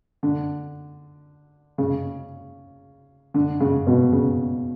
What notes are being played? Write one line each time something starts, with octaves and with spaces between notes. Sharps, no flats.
D3
C#3
D3
C#3
B2
C#3